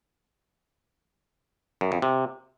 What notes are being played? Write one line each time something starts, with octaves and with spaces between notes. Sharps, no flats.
F#2
F2
C3